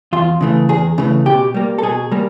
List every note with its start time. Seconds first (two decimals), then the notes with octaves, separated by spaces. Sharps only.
0.13 E2 F4
0.41 C#3 E3 A3
0.69 E2 G#4
0.98 C#3 E3 A3
1.26 B2 G4
1.54 G3 A#3
1.78 A4
1.83 B2 G#4
2.12 G3 A#3